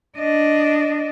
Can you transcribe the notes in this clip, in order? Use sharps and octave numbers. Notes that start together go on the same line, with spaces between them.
D4 D#5